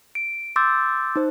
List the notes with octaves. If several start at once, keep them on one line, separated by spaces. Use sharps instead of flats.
D7
C6 D6 E6 G6 A6
D#4 C5